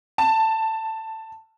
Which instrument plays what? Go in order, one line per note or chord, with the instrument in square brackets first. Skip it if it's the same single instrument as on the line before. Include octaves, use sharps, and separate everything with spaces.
[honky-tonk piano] A5